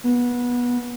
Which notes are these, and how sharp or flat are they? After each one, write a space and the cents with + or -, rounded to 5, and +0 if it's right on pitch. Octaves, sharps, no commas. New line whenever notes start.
B3 -20